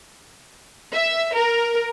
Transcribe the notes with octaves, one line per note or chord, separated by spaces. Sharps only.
E5
A#4